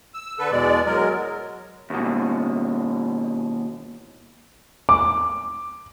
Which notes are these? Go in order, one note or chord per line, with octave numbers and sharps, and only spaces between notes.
E6
D3 A4 B4
E2 B2 G#3 D5
F#3 G#3 A#4
D#2 B2
D6